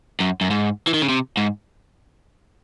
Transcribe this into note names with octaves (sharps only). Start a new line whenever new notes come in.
F#2
F#2
G#2
E3
D#3
C#3
C3
G#2